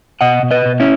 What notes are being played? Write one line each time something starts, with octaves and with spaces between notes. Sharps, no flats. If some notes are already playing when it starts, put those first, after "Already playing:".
B2 D#5 F#5
B2
B4 D#5
B2
C#4 E4